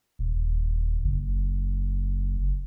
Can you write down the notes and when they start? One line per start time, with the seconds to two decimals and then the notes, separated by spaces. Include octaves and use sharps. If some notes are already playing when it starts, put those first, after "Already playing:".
0.19 D#1
1.04 F#1